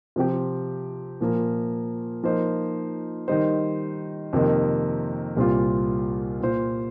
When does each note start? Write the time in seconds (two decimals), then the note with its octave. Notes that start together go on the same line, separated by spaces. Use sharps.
0.16 C3 F3 C4 G4
1.21 A#2 F3 A#3
2.24 F3 A#3 D#4 C5
3.28 D#3 G3 D#4 C5
4.33 F2 C3 D#3 A#3
5.37 C2 A#2 G3 C4 F4
6.40 A#2 A#3 F4 C5